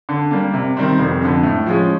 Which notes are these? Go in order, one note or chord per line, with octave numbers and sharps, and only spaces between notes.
D3
G3 A#3
C3
D#3 G3 C4
F1
F2 D3
A2
F3 G#3 C#4